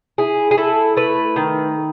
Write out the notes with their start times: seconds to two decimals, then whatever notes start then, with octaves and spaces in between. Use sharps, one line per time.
0.18 E4 G#4
0.51 G#4
0.57 E4 A4
0.97 A3 B4
1.36 D#3